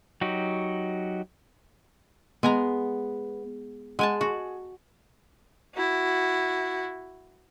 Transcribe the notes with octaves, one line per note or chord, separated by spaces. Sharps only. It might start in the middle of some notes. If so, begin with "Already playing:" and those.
F#3 D#4 F#4 G4
G#3 B3 G#5 A#5
G#3 F#5 G#5 A5
F#4 G#4
E4 F#4